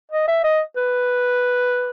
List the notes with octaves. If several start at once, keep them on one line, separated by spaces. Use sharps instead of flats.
D#5
E5
D#5
B4